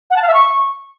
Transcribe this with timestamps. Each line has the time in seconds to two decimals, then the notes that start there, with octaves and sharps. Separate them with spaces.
0.10 F#5
0.16 A5
0.22 F5
0.28 E5
0.34 C#6